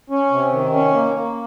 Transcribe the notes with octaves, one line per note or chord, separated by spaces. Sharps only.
C#4
C3
D#3
C#4
A#3
A#3